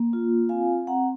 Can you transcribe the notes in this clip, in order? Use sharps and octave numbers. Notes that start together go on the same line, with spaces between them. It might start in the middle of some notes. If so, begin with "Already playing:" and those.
Already playing: A#3
F4
C4 F5 G#5
C4 F#5 A#5